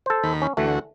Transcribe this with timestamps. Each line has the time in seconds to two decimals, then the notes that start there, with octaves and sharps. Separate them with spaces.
0.06 A4 C5
0.23 D#2 D#3 B5
0.42 C#4
0.57 D2 D3 E3 A3 F#4